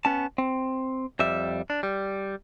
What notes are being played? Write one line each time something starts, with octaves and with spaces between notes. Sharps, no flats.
B3 C#4 A5
C4
F2 G3 E5
D4
G3